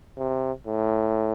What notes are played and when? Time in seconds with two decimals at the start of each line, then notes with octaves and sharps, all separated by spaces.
0.17 C3
0.67 A2